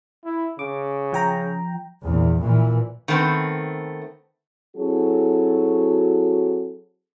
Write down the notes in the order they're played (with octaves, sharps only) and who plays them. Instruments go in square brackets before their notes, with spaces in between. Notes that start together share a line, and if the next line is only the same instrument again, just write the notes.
[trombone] E4
[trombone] C#3 [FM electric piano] D6
[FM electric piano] F3 G5 A#5
[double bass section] A#1 E2 C3
A#2 E3
[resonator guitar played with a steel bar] D#3 A3 B3 C4
[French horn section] F#3 C4 E4 F#4 G#4 A4